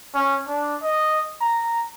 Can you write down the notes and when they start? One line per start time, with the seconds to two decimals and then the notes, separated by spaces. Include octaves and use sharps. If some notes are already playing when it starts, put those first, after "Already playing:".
0.15 C#4
0.48 D4
0.83 D#5
1.41 A#5